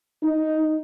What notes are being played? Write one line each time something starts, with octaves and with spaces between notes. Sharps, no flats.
D#4